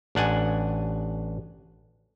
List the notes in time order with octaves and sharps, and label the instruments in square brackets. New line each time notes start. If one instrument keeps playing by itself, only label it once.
[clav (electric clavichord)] A1 D4 F#5 G#5